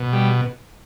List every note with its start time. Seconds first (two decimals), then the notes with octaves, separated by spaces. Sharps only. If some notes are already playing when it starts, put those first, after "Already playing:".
Already playing: B2
0.13 G3